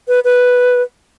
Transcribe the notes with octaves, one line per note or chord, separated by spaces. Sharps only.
B4
B4